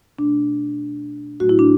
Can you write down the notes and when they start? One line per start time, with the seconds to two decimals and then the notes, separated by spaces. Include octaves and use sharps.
0.18 B2 A3 D4
1.40 A2 F#3 A3 F#4
1.49 E4
1.59 D4